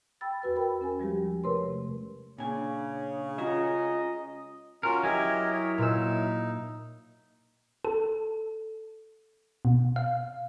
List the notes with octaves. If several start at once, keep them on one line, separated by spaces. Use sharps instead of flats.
G5 B5 E6 A6
E2 F#4 B4 E6
A#4 C5 G5 B5
C#4 A#4 G#5
F3 G3 G#3 G4
C3 A3 A#4 B4 C#5 C6
A#2 C#3 D4 G#5
G#3 C#4 F4 F#4 G#4 D#5 A#5
C#4 F4 F#4 A#4
F#3 E4 G4 A#4 D#5 G#5
C#5
A#2 D#4 E6
A4
B2
F5